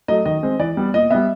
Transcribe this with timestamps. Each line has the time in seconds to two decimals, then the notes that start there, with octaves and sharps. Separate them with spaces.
0.08 F#3 A3 D#5
0.26 D#3 D#5
0.43 G#3 C4
0.59 E3 D5
0.77 G3 B3
0.94 A#2 D#5
1.11 G3 B3 E5